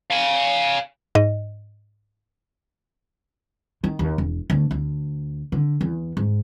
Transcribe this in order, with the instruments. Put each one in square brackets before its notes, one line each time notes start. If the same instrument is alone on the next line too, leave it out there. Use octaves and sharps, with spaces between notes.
[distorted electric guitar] F5 G#5
[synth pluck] G#2 D#5
[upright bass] D#3
D#2
E1
D2
D2
D3
E2
G#2